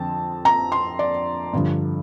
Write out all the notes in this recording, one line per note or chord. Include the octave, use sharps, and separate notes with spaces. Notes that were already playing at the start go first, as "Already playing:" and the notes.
Already playing: F2 D3 F3 C4 A5
A#5
C6
D5
G2 D3 F3